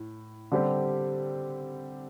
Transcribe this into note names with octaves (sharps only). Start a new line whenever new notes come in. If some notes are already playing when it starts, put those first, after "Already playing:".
Already playing: A2
D3 G3 C4 G4